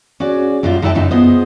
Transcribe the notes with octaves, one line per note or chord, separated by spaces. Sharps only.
C#4 F#4 G#4 D5
F#2 F#3 G3 F4
F#2 D#4 E4 A4 G5 A5
F#2 A#2 C#3 D#4
B3 F4 G#4 C5 D#5